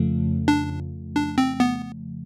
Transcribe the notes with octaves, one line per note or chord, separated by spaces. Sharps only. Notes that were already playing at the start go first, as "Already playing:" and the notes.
Already playing: F2 C#3 F3 A3
D4
D4
C4
B3